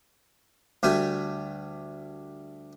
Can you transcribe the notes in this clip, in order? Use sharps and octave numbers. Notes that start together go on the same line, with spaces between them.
D2 G3 A3 G#5